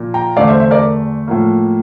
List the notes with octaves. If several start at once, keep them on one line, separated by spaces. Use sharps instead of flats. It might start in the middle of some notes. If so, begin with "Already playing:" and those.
Already playing: A#2 F3 A#3
G5 A#5
E2 D3 A3 D5 F5
C5 E5
C5 E5
A#4 D5
A2 F3 A#3